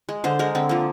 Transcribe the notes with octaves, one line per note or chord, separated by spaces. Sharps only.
G#3
D3 C5
G#3 A#4
D3 C4
F3 A#3